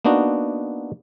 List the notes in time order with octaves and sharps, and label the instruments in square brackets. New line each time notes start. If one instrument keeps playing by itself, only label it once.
[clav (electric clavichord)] A#3 B3 D4 D#4 F#4